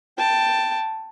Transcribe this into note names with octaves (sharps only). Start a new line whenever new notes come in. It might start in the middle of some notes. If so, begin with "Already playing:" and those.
G5 A5